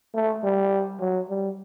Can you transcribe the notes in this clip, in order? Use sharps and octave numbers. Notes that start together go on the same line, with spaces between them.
A3
G3
F#3
G3